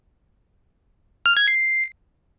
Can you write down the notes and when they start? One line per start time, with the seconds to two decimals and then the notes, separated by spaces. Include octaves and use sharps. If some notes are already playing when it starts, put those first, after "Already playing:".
1.26 F6
1.37 G#6
1.48 C7